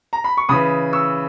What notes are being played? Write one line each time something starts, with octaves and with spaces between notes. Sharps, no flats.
A#5
B5
C#6
C#3 E3 B5 D#6
C#6 E6